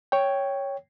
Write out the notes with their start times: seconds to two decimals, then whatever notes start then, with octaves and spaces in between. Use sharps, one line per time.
0.12 C#5 G5